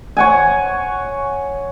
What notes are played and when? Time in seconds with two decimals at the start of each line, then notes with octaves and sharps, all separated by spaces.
0.17 C#5 F#5 G#5